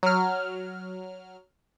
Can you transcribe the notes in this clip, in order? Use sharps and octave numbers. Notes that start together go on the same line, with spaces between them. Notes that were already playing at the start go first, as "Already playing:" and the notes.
F#3 F6